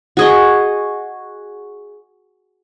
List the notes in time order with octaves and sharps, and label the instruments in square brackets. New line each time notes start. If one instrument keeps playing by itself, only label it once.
[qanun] F#4 G#4 D#5